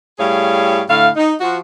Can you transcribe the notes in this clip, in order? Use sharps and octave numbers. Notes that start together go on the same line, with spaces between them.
A2 G3 G#4 C#5 F5
A2 D3 A3 F5
D#4
F3 F#4